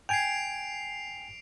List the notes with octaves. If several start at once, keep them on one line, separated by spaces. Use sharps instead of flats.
G5 G#5 G#6 C7 D7 F7